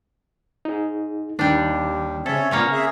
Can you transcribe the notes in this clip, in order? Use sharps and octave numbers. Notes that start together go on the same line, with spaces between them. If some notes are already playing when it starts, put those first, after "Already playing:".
D#4 G#4
D#2 D#3 G3 D4
C#3 C4 C#4 A4 C#5 E5
A#2 G3 A#3 B3 C#4 C#5
G#4 E5